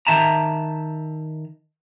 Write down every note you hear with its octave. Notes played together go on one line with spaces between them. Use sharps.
D#3 E5 A5 A#5